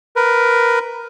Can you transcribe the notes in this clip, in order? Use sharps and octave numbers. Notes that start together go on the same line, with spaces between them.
A#4 B4